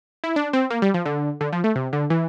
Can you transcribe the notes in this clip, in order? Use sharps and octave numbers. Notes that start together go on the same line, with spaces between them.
E4
D4
C4
A#3
G3
F3
D3
D3
F3
A3
C3
D3
E3